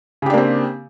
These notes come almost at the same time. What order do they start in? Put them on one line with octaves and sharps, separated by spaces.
C#3 G4 D4 A#3 C4